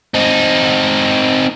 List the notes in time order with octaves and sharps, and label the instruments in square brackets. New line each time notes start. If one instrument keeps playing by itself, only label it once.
[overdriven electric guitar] C4 D#4